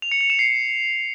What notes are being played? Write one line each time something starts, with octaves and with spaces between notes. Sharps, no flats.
F7
C#7
F7
E7
C7